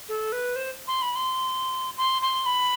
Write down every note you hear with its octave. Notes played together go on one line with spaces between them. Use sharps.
A4
B4
C5
C6
B5
C6
C6
C6
B5